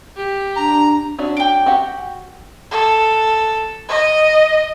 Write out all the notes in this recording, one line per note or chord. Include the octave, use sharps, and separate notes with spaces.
G4
D4 A#5
C#4 D4 F#4
G5 D6
F#4 G4 F#5
A4
D#5